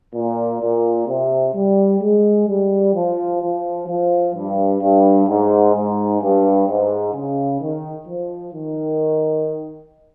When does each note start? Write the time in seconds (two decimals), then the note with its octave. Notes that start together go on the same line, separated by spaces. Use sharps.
0.14 A#2
0.61 A#2
1.07 C3
1.55 G3
2.01 G#3
2.48 G3
2.94 F3
3.41 F3
3.87 F3
4.34 G2
4.81 G2
5.28 G#2
5.74 G#2
6.21 G2
6.68 G#2
7.14 C#3
7.61 D#3
8.07 F3
8.55 D#3